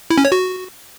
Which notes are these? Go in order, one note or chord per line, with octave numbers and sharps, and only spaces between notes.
E4
C#4
C#5
F#4